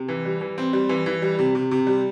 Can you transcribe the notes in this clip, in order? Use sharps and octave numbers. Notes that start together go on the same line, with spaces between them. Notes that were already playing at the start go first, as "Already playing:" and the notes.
Already playing: C3
E3
G3
E3
C4
G3
E3
E3
G3
C3
C3
C3
G3